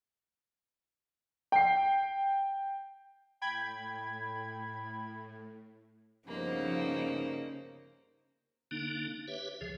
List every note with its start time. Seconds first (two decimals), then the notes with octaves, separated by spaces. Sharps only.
1.52 G5 C7
3.42 A2 G5 B5 G#6
6.28 G2 C#3 F3 A#3 B3 D#4 C5
8.71 D3 A#3 D4 D#4
9.28 G4 B4 C#5 E5
9.61 C#2 C#3 F3 G#4